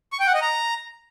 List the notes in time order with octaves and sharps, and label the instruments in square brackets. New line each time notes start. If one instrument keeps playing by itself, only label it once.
[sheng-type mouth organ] C#6
G5
F#5
D#5
A#5